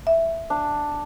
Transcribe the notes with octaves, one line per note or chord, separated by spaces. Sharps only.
E5
D4